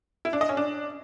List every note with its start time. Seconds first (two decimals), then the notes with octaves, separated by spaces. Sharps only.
0.25 E4
0.33 D4
0.41 D#5
0.49 C#4
0.57 D4